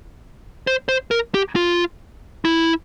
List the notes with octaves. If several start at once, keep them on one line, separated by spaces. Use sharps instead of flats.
C5
C5
A#4
G4
F4
E4